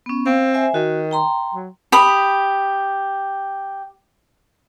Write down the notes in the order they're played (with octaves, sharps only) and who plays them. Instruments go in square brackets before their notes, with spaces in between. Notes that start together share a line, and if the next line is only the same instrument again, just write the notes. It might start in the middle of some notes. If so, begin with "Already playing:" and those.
[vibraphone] B3 C#4
[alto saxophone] C4 [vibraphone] F5
[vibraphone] C5 E5 G#5
[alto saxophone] D#3 [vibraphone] F#4
[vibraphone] G5 A#5 C6
[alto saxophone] F#3
[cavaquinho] G4 B5 D#6